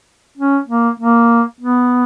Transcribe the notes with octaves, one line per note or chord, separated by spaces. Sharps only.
C#4
A#3
A#3
B3